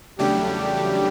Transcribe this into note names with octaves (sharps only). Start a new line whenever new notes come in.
E2 C#3 F#3 G3 A3 D4 G4